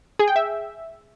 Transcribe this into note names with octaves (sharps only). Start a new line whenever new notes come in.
G#4
G5
E5